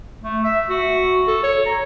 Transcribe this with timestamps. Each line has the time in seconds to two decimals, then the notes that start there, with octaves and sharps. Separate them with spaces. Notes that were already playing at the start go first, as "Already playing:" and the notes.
0.24 A3
0.44 E5
0.69 F#4
1.28 A4
1.43 C#5
1.66 A#5